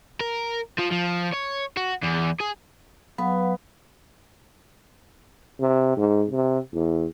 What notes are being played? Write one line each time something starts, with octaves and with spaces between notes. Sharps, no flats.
A#4
F3
F3
C#5
F#4
E2
G#4
F#3 B3 B4 F5
C3
G#2
C3
E2